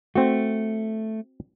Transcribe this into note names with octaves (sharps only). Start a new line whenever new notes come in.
A3 C4 F#4